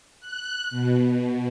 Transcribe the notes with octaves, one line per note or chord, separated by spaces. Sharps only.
F#6
B2